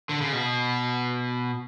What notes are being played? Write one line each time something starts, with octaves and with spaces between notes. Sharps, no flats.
D3
C#3
B2